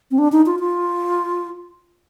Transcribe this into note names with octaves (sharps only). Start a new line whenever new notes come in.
C4
D4
D#4
F4
F4